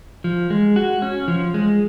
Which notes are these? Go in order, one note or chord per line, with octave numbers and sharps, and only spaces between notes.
F3
G#3
F#4
C#4
F3
G#3